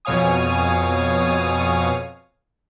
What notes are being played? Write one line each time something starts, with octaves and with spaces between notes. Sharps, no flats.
F2 B2 C#5 F5 G#5 D#6